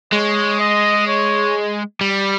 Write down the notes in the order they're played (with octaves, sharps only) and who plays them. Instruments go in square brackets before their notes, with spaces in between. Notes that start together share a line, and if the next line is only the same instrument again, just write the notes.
[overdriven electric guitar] G#3 [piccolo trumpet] C#5
[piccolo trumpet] D#5
C#5
[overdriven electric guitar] G3